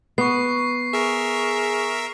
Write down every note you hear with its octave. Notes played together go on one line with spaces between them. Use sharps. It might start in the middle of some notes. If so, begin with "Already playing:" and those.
B3 C#6 C7
G#4 A#4 E5